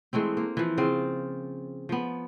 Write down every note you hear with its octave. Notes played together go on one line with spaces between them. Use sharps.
E3 G#3 A3 C4
A#3
E3 F3
C#3 C4 F4
F3 B3